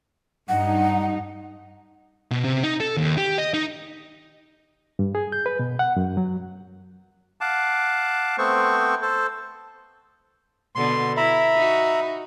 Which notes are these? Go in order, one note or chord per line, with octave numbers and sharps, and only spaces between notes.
G2 D#4 F#5
B2
C3
D#4
A4
D#2
G4
D#5
D#4
G2
G#4
G6
B4
B2
F#5
F#2
F#3
F5 F#5 A5 D6
A3 B3 C4 C5 C#6
A4 C5
B2 D3 B3 C6
E4 E5 A#5 B5
D#4 F#4